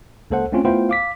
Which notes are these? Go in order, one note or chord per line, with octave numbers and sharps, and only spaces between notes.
C#2 A#3 A4 C5 F#5
A3 C4 C#4 F4
A3 B3 E4 F4 C5 G5
F5 D6 B6